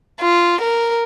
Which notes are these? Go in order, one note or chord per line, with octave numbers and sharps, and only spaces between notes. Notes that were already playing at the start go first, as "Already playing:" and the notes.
F4
A#4